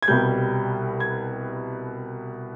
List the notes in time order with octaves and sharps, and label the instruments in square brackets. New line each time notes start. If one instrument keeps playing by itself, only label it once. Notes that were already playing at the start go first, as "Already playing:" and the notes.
[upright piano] G#6
C2 B2 G3 G6
G#6